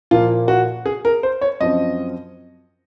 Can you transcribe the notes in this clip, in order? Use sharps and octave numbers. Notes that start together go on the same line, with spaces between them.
A#2 F3 A#3 F4
F#4
G#4
A#4
C5
C#5
F#2 F3 C4 D#5